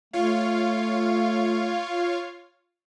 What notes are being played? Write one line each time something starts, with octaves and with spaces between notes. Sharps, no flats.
A3 F4 C#5 F5